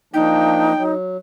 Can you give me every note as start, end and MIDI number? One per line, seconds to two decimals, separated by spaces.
0.14 0.72 53
0.14 0.72 58
0.14 0.72 62
0.14 0.94 63
0.14 0.83 79
0.77 1.17 54